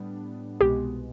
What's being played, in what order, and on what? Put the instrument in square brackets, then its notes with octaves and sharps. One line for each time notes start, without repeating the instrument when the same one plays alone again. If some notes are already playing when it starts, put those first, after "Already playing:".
Already playing: [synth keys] A2 G3 B3 D4
[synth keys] C2 B2 G#3 B3 [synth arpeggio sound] G4